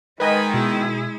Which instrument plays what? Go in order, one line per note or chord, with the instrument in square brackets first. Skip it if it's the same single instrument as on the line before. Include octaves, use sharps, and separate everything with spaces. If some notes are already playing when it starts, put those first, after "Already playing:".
[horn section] D#3 [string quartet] G#3 [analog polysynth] B4 D#5 [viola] G#5 B5
[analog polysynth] B2 [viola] E4 G#4